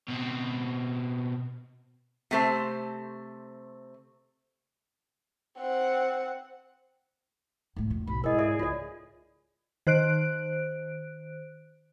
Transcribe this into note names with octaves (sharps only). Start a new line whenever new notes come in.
B2 C4
C3 A3 C5
C4 F#5
A2 A3
F2 A2
B1 B5
G#2 E4 G#4 A#4 D#5
A4 D5 E5
C#2 F4 D5
D#3 C5 F#6 D7